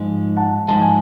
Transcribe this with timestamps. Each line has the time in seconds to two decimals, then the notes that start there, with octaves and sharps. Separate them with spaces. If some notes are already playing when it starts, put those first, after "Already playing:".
Already playing: G#2 F3 G#3
0.37 F#5 A5
0.68 G#2 F3 G#3 A5
0.81 G#5